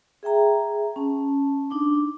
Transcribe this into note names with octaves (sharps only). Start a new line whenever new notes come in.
G#4 E5 G5 A#5
C#4 A5
D4 D#4 D6